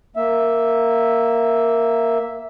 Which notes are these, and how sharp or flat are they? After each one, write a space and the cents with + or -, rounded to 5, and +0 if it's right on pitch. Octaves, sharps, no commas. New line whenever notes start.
A#3 +0 E5 +0